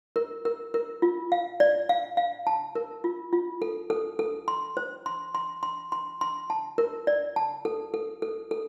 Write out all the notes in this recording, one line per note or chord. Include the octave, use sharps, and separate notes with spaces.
A#4
A#4
A#4
F4
F5
D5
F5
F5
A5
A#4
F4
F4
A4
A4
A4
C6
C5
C6
C6
C6
C6
C6
A5
A#4
D5
A5
A4
A4
A4
A4